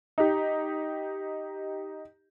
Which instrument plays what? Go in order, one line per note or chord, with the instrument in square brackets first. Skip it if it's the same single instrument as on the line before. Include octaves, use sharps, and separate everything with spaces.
[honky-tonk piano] D#4 G4